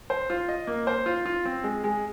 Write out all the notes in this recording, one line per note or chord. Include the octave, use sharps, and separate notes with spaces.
C5
F4
D#5
A#3
C5
F4
F4
C4
G#3
G#3